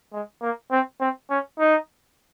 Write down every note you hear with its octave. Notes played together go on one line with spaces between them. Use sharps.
G#3
A#3
C4
C4
C#4
D#4